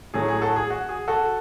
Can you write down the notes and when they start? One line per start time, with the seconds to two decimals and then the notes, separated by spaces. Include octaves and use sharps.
0.14 A2 F#3 A3 G#4
0.28 G#4
0.42 F#4 A4
0.56 G#4
0.70 F#4
0.89 G#4
1.08 F#4 A4